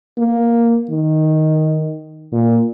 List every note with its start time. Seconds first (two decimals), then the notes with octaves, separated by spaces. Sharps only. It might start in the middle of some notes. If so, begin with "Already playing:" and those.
0.18 A#3
0.90 D#3
2.33 A#2